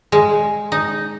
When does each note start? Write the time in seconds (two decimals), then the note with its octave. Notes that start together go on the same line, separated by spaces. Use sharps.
0.12 G#3
0.72 D#4